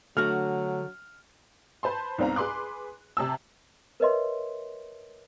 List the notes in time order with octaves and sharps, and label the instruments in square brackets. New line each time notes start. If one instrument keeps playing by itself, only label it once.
[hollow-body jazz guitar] D3 F#4 [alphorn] F#3 [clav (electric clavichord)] A3 [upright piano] F6
[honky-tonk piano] B4 C5 A5 C6
C2 G#2 B3 C4 F5 A#5
G#4 B4 C6 D6 F#6
C3 A5 E6
[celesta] A#4 B4 C#5 D#5 E5 C6